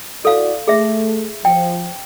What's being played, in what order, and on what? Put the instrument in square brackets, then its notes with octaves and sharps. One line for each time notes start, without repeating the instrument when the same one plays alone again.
[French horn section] E4 F#4 D5 [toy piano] A4 F5
[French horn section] A3 [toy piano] G#4 E5
[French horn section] F3 [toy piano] G5